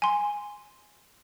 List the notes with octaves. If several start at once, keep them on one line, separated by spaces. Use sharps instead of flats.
G#5 C6